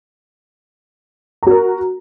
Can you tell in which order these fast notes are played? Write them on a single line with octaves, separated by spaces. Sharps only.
A#5 F#4 A#4